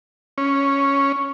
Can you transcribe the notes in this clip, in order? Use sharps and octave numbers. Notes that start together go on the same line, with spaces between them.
C#4